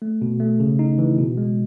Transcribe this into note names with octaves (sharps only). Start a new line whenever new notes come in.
A3
B2
A3
C#3
D#4
E3
B2
G#3